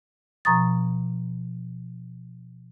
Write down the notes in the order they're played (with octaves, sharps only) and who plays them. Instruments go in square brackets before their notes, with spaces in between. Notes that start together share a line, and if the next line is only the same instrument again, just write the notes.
[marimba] B2 F3 A#5 C#6 D#6 A6